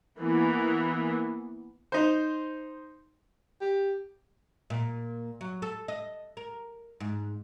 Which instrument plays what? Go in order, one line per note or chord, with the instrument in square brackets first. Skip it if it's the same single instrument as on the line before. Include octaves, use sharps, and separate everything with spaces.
[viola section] E3 A#3 B3
[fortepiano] D#4 C5
[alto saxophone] G4
[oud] A#2
F#3
A4
D#5
A#4
G#2